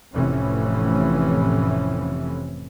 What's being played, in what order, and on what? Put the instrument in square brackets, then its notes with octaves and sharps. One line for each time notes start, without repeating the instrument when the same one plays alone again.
[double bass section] F1 A2 C3 E3 C#4